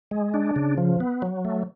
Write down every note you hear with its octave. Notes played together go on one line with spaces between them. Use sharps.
G#3
D4
C#3
F3
B3
F#3
A3